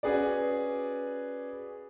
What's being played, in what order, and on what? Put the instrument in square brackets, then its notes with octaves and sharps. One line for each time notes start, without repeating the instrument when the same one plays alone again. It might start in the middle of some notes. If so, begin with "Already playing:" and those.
[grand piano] C#4 F#4 G#4 B4 D5